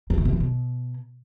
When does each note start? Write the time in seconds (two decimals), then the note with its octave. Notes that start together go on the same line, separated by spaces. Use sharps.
0.10 G2
0.18 D3
0.25 C3
0.33 E3
0.40 B2